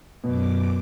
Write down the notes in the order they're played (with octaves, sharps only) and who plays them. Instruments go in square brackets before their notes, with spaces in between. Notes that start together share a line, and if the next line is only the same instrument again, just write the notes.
[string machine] F#2 D6 [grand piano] B2